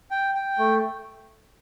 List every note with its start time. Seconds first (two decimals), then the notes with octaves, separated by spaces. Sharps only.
0.11 G5
0.35 G5
0.59 A3